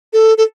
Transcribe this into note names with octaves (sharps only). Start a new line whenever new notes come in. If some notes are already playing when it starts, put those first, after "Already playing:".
A4
A4